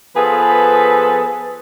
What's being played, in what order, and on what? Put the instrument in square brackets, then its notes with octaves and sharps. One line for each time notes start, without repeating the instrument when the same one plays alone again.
[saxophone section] F3 B3 G#4 A4 B4